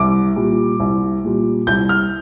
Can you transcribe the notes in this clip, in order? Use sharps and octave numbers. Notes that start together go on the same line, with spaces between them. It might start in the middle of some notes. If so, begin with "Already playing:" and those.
Already playing: C2 D6
A#2 G3
C2
A#2 G3
C2 G6
F6